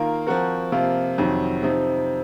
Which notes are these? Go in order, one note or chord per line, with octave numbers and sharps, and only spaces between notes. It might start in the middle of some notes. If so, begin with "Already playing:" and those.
Already playing: D#3 A#3 F4 A#4
F3 C4 F#4 A#4
C3 F3 A#3 F4
F2 C3 D#3 F#3
C3 F3 C4 D#4